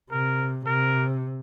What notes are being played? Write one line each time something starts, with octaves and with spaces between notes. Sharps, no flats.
C3 A#4
C3 A#4